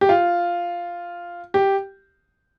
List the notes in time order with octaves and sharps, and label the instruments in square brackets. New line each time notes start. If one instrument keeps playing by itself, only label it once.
[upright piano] G4
F4
G4